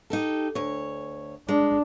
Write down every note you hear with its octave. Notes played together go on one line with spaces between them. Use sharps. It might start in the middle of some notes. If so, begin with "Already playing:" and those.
D#4 G4 A4
D2 C#5
G#3 D4